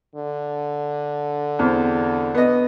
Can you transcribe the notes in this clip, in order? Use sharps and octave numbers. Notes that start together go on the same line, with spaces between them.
D3
E2 C4
B3 D#5